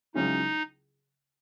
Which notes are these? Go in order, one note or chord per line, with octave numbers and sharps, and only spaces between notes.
C#2 C#3 F#3 C#4 D#4 E4